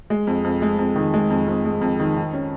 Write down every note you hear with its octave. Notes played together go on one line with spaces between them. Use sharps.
G#3
F2
F2
G#3
F2
D#3
G#3
F2
F2
G#3
F2
D#3
D#3
C#4